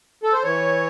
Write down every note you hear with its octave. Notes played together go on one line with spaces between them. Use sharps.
A4
C5
E3 C#5